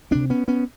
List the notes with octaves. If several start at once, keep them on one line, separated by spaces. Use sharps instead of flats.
D2 C3 C4 D4
B3 C#4
B3 C#4